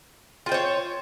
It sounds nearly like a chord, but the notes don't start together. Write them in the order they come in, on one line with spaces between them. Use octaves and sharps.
F4 G5 C5 C#5